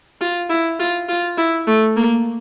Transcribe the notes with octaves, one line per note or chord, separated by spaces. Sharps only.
F4
E4
F4
F4
E4
A3
A#3